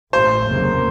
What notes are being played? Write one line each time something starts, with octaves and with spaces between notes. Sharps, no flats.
A1 A2 A3 C5
F1 D#2 C#3 F#3 A#3